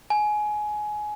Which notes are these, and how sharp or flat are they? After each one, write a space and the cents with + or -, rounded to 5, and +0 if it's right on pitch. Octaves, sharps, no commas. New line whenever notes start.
G#5 +20